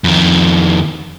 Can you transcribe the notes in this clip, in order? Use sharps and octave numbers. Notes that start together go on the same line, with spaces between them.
F2 D#3